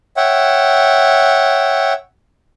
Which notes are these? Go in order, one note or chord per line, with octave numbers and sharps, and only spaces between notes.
C#5 E5 F#5 G5